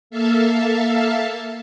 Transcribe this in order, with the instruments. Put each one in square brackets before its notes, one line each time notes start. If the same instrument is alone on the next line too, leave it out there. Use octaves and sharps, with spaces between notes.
[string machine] A#3 A4 E5 F5 A5